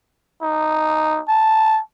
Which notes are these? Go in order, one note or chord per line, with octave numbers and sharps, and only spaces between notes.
D#4
A5